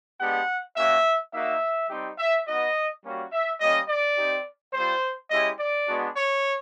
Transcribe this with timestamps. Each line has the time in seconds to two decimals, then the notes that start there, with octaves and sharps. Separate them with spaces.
0.20 G#3 B3 D4 G4 F#5
0.77 A#3 C#4 F#4 E5
1.34 A#3 D#4 F#4 E5
1.90 G3 C4 D#4 G4
2.19 E5
2.48 B3 D#4 F#4 D#5
3.04 G3 A#3 C#4 F#4
3.32 E5
3.61 G3 A#3 C#4 D#5
3.89 D5
4.18 C4 D#4 G4
4.74 G3 C4 F4 C5
5.31 G#3 C#4 E4 G4 D#5
5.60 D5
5.88 G#3 B3 D4 F#4
6.16 C#5